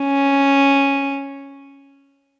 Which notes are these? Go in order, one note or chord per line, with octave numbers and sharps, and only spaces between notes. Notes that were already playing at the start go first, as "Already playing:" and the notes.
Already playing: C#4